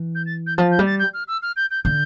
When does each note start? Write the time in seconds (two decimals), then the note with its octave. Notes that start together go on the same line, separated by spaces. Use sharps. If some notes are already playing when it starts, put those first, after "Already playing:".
Already playing: E3
0.15 G6
0.26 A6
0.46 G6
0.57 F3 A6
0.71 G6
0.79 G3
0.86 A6
0.99 G6
1.14 F6
1.28 E6
1.42 F6
1.56 G6
1.71 G6
1.84 D3 G6